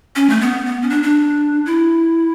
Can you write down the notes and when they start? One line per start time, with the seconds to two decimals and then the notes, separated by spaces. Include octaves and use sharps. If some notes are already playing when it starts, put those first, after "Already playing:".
0.16 C#4
0.29 A3
0.41 B3
0.66 B3
0.82 C#4
0.90 D4
1.03 D4
1.66 E4